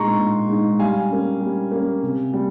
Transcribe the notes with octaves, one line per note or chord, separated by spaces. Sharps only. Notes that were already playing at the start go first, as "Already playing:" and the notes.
Already playing: A#2 G#3 D#4 A#5 C6 C#6
A#2
G#3 D#4
G3 F5 G#5
A#3 C#4
G3
A#3 C#4
C3
G3